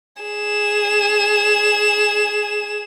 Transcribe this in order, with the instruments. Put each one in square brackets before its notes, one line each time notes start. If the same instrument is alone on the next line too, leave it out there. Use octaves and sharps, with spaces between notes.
[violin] G#4 E7